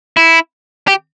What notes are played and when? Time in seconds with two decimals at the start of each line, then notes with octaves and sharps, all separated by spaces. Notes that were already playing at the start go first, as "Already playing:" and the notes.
0.17 E4
0.88 G4